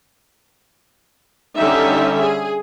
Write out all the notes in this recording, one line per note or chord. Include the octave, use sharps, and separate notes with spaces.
D3 G3 C#4 D#4 E5
G#4